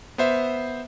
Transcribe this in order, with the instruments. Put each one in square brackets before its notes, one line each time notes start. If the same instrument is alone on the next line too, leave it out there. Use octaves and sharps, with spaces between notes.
[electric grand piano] B3 C5 E5